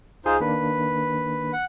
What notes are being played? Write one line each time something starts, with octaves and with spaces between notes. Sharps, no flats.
C2 D#4 F4 G#4 C5 G#5
D#3 A#3 D4 B4
F#5